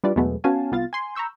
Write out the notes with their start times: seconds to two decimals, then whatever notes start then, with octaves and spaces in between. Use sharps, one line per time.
0.04 G3 D4 E4 F4 B4 D5
0.16 E2 B2 F#3 G#3 A3 B3
0.44 B3 C#4 F#4 F5 G#5 A5
0.72 C2 B3 F4 F5 A6
0.93 G#5 C6
1.15 A#5 B5 C#6 E6 G6